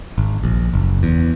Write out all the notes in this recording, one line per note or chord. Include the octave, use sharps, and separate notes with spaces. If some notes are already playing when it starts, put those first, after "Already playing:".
G#1
A#1
F#1
E2